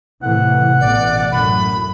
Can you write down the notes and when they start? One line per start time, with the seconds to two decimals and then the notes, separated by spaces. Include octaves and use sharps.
0.23 A2 C3 E3 F#5
0.81 A1 B2 D5
1.32 F#2 A2 B5